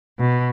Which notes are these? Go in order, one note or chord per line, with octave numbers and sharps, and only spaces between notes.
B2